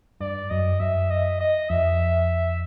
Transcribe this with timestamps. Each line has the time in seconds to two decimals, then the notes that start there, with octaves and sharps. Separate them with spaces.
0.20 G2 D5
0.50 F#2 D#5
0.80 F#2 E5
1.11 D#5
1.41 D#5
1.70 F2 E5